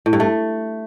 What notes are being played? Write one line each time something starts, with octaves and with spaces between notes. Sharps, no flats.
A2
G2
A3